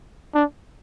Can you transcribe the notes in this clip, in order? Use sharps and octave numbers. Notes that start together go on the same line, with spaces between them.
D4